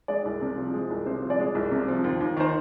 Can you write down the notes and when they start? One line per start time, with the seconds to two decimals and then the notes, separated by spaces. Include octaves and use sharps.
0.08 G#3 D5
0.25 C2
0.42 C3
0.57 F3
0.74 G#3
0.90 C2
1.06 C3 C5
1.22 F3
1.30 D5
1.39 G#3
1.55 C2
1.71 C3
1.88 F3
2.04 D#2
2.20 D#2
2.37 D#3 C5